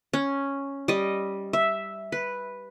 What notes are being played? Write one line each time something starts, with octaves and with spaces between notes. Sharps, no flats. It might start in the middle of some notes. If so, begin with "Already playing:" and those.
C#4
G3 D#5
E5
B4